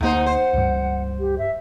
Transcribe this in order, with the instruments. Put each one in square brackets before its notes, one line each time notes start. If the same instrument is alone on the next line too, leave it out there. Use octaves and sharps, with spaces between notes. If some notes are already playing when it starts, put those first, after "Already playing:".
[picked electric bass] D2 A#3 [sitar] G#2 D#4 C5 [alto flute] F#5
[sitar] C5
[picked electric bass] C#2 G2
[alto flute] G4
E5